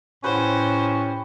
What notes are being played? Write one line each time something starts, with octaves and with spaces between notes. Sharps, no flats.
A2 C#4 G4 B4 C5